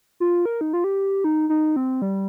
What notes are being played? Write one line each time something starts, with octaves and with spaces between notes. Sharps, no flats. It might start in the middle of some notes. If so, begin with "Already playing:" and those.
F4
A#4
D#4
F4
G4
D#4
D#4
C4
G3